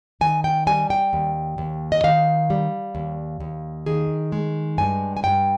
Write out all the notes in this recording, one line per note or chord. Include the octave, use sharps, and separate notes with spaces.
D#3 G#5
G5
G3 G#5
G5
D#2
D#2
D#5
D#3 F5
G3
D#2
D#2
D#3 G#4
G#3
G2 G#5
G#5
G2 G5